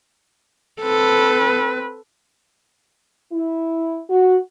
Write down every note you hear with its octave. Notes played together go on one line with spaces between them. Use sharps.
C4 A4 B4
E4
F#4